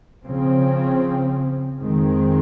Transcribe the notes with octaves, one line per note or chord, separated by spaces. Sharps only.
C#3 F3 C4
F2 D#3 G#3 C4